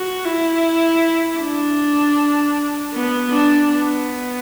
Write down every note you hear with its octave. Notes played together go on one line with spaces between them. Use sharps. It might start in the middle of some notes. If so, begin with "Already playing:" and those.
Already playing: F#4
E4
D4
B3
D4
B3